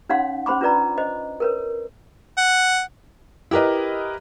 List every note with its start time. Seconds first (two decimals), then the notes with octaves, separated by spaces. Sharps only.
0.09 C#4 D#4 C#5 F5 F#5 C6
0.46 C#4 C5 B5 C6 D6
0.61 D4 F4 B4 D5 A#5
0.98 C5 D#5
1.40 A#4 B4 C#5
2.38 F#5
3.51 E4 G4 A#4 B4 D#5